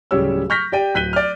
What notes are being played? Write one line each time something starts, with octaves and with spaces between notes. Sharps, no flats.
D1 C#3 G3 G4 C#5 E6
C#6 F6 G6 A#6 B6
G4 D5 G5 D#7
D1 F#6 B6 D#7 G7
D5 F6